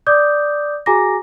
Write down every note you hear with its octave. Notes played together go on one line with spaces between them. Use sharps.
D5 D6 D#6 G6
F#4 G#4 G#5 A#5 D6 A#6